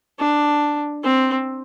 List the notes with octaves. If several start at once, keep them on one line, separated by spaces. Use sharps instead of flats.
D4
C4